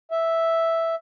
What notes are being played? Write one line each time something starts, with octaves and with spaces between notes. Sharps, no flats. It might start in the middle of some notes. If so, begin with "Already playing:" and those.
E5